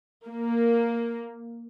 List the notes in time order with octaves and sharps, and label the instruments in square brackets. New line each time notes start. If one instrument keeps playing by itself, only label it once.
[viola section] A#3